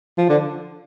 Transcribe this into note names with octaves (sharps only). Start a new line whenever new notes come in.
F3
D3